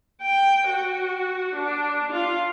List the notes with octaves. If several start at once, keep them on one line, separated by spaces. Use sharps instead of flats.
G5
F#4
D4
F4